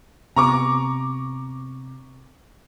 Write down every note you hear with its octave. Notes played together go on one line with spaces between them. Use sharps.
C3 B3 A#5 C#6 D6